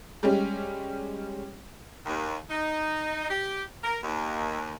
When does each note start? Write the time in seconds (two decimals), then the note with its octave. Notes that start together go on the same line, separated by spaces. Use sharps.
0.23 G3 G#3 C#4
2.05 D#2
2.50 D#4
3.30 G4
3.83 A#4
4.03 D#2